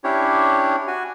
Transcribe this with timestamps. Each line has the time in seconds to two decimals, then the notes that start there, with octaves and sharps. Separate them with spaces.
0.04 C#4 D4 E4 G4 C#5
0.87 F#4 G#5